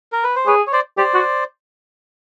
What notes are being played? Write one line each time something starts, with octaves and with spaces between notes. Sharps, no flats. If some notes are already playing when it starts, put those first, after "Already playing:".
A#4
B4
C5
G#4 B4 C#5
C#5
C5 D5
G4 C5 D5
F#4